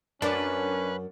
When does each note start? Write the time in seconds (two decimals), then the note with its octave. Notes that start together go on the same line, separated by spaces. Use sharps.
0.22 F#2 C#4 D4 B4